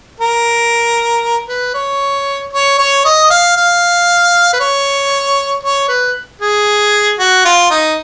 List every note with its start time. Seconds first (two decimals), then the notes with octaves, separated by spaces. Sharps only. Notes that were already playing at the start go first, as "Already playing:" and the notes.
0.20 A#4
1.49 B4
1.74 C#5
2.53 C#5
2.79 C#5
3.05 D#5
3.30 F5
3.57 F5
4.53 B4
4.60 C#5
5.63 C#5
5.89 B4
6.42 G#4
7.19 F#4
7.45 F4
7.71 D#4